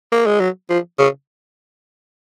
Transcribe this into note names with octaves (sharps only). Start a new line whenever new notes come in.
A#3
G#3
F#3
F3
C#3